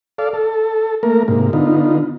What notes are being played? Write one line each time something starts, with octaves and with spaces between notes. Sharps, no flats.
A4 D5 F5
A4
A3 A#3 A#4
G#2 C3 A#3
D3 B3 D#4 F4